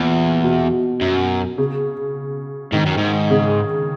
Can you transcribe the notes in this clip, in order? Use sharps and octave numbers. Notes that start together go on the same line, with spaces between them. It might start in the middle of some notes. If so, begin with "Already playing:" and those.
Already playing: E2 A#2
B2
F#2
C#3
G#2 D#3
F#2
G#2
C#3